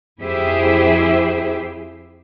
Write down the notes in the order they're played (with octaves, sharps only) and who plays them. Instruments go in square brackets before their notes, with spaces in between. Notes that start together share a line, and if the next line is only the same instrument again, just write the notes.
[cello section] F2 E4 G4 G#4 C5 E5